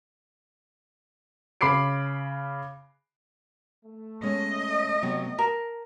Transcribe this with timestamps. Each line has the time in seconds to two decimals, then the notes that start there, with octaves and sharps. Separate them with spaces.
1.61 C#3 B5 D6 C7 D7
3.85 A3
4.23 G#3 B3 C#4 D#5
5.02 C3 F#3 B3
5.39 A#4 A5